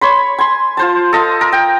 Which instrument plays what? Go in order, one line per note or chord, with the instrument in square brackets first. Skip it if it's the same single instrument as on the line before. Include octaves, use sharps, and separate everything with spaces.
[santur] C#5 B5 C6
G#5 C6
F4 C5 A5
A4 D#5 F5
A#4
G5